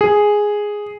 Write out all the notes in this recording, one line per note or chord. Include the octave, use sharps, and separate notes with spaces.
G#4